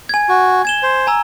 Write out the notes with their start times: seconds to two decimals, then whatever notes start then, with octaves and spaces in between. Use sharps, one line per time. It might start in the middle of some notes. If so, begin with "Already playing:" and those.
0.09 G#5 G#6
0.29 F#4
0.65 G#6 E7 G7
0.83 C5
1.07 G#5 A#5 E6